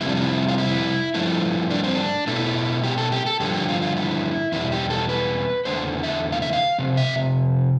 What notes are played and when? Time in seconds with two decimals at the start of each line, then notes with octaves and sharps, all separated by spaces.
0.01 F2 C3 G3 E4
0.09 D4
0.17 E4
0.48 F4
0.58 E4
1.14 G2 F3 A3 E4
1.71 D4
1.84 C4
1.96 D4
2.27 B2 A3 E4
2.84 G4
2.98 A4
3.12 G4
3.26 A4
3.40 G2 D3 F3 A3 G4
3.54 G4
3.69 F4
3.82 F4
3.97 E4
4.52 E2 B2 G3 E4
4.72 G4
4.90 A4
5.09 B4
5.65 E2 D3 A3 C5
6.03 E5
6.32 F5
6.42 E5
6.53 F5
6.78 F2 C3
6.97 E5